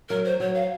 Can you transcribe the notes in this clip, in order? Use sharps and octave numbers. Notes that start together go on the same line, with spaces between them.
F#3 A#4
C5
F#3 C#5
F5